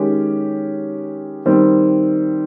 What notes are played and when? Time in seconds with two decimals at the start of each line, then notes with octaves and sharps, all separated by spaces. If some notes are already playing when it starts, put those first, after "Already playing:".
Already playing: D#3 G#3 C#4 G4 A#4
1.45 D#3 G3 C4